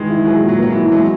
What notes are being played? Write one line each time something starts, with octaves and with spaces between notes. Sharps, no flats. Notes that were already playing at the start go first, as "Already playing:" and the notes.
Already playing: D#3 E3 G#3
E4
F#3 G#4
A#2
F#3
F#3 A#3
E3
E4
F#3 G#3